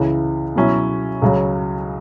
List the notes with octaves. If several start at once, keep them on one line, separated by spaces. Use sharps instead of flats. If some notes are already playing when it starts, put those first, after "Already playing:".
Already playing: C#2 C#3 E3
B2 F#3 C#4 E4
C#2 C#3 F#3